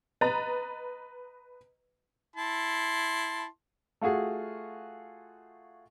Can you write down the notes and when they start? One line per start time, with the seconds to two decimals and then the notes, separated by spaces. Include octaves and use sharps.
0.21 B4 D#5 A#5 A6
2.36 E4 A5 C6
4.01 A3 F4 F#4 G#4